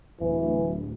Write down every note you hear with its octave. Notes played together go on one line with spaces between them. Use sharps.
D1 E3